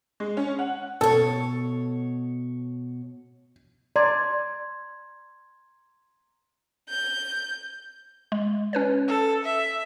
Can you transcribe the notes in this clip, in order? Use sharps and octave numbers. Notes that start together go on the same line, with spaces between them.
G#3
C#4
F#5
B2 A4 C#5
D5 A#5 C6 G#6
G6
G#3
C#4 B4 C#5
A4
E5